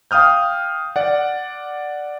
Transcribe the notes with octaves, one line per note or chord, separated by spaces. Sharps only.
F5 G5 D#6 F6 G6
D5 F#5